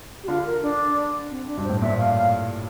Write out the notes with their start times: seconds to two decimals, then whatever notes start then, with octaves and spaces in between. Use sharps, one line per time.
0.24 G4
0.28 D3 F4
0.46 A#4
0.62 D4
1.31 C4
1.48 D4
1.57 G2
1.64 A2 C5
1.82 A#2 E5
1.98 F5
2.15 F5